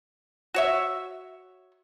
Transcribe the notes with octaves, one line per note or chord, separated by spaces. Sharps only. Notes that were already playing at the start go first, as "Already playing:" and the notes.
F#4 C#5 E5